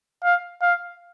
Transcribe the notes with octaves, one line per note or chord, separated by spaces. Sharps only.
F5
F5